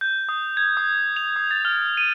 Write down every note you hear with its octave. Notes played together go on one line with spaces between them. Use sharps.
G6
D#6
G#6
D#6
F7
D#6
A6
F6
D#7